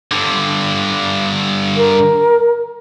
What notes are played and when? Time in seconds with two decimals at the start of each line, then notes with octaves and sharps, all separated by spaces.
0.12 G2 D3
1.76 A#4